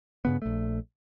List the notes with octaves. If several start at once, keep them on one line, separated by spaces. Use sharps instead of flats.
G2 C#3 B3
A#1 A3